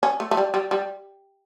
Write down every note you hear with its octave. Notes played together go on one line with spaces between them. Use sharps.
C#4
A3
A3
G3
G3
G3